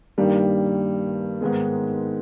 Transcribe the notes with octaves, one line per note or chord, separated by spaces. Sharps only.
G2 D#3 G3 A#3
G#2 D#3 G#3 B3